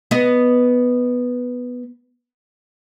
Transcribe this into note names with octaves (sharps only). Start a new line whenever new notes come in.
B3 D#5